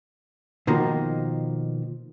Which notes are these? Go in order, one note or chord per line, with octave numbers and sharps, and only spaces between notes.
B2 D#3 F3 A#3